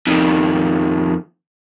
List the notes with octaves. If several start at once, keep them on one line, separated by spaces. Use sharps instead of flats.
F2 D#3